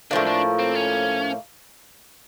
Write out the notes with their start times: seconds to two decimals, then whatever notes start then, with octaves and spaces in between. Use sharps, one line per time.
0.11 A2 F3 A#3 D4
0.27 D4
0.59 C4
0.75 C#4